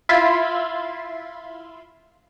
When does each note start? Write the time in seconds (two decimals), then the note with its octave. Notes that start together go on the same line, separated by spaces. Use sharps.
0.09 E4 F4 E5 F5 B5 C6